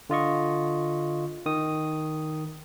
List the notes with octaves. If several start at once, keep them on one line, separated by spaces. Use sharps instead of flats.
D3 F4 D#5 C#6
D#3 D#6